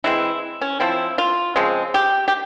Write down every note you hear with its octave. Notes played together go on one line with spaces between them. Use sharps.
E3 G#3 C4 E4
C#4
F3 C4 E4
F4
C#3 F3 G#3 C4
G4
G4